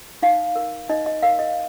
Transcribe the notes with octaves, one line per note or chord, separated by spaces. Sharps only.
D#4 F5
A#4
D#4 D#5
D#5
A#4 F5
D#5